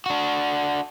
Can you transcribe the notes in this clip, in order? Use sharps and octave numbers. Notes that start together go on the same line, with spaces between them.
D4 F#4